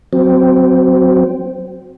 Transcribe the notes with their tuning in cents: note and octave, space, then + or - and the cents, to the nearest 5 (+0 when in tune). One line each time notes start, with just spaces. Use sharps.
F#3 +0 C4 -10